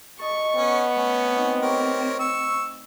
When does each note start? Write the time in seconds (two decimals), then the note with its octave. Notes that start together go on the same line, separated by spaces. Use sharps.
0.19 A4 D#5 C#6
0.56 B3 C#4
0.96 A3 C#4 B4
1.32 C4 D4 D#4
1.62 G4 A#4 C#5
2.20 C#6 E6